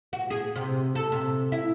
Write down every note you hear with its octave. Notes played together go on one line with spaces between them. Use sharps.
F#4
G#4
C3
A4
C3
E4